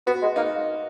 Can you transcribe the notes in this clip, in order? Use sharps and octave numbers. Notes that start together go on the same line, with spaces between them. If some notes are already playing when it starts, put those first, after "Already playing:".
B3 F#4
G#3
A#3 D#4